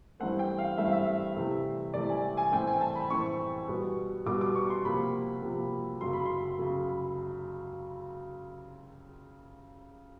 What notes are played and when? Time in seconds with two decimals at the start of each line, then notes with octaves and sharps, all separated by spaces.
0.20 G2 E3 A3 C4 F#5
0.39 G5
0.58 F5
0.77 G2 E3 A3 C4 E5
0.85 F5
0.93 E5
1.36 C3 E3 A3
1.94 C3 E3 A3 D5
2.09 G#5
2.37 G#5
2.52 A2 E3 A3 C4 G5
2.67 G#5
2.81 A5
2.95 B5
3.10 A2 E3 A3 C4 C#6
3.68 B2 G3 B3
4.26 B2 G3 B3 D6
4.41 D6
4.55 C#6
4.70 C6
4.85 C3 F3 A#3 B5
5.42 C3 F3 A#3
6.01 F#2 C#3 F#3 C6
6.13 B5
6.25 C6
6.59 C#3 F#3